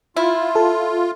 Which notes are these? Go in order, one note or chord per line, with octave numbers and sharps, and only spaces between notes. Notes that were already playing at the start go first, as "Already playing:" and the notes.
E4 F4
A4